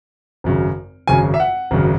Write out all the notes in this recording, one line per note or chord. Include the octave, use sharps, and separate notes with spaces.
G#1 F#2 C#3
G#1 F#2 C#3 G#5
E5
F#5
G#1 F#2 C#3